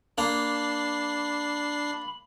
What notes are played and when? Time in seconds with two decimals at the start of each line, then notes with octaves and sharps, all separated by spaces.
0.18 A#3 D4 B5 C7